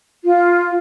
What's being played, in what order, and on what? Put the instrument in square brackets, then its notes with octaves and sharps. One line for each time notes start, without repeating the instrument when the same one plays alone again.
[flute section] F4